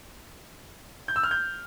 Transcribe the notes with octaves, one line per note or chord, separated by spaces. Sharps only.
G6
E6
F6
G6